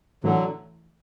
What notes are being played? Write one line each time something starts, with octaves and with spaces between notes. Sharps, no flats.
A2 D3 E3 F#3 A3